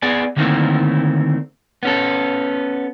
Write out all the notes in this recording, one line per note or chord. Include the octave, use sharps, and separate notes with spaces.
B3 G#4 D5 G#5
D3 D#3 A3 A#3 C4 E4
B3 C#4 A4